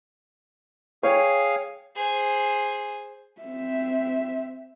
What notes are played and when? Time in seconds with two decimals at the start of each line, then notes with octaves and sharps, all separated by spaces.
1.03 G#4 C#5 F5 G5 G#5
1.95 G#4 C5
3.41 C4 E5